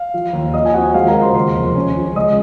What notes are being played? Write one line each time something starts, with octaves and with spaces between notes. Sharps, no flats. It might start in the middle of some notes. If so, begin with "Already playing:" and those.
Already playing: F5
F3
D#2
F3 D#5 D#6
G#5
C4 F#4 F#5
G#3 F4 F5
A#4 A#5
C#3
C5 C6
D#2 C5 C6
F1
C#4
C#2
G#3 D#5 D#6